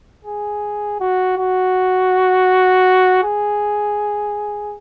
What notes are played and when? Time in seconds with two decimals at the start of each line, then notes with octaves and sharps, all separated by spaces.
0.25 G#4
1.00 F#4
1.37 F#4
3.23 G#4